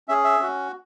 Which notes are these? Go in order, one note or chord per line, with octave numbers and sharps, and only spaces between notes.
C#4 G#4 E5
E5
C#4 F#4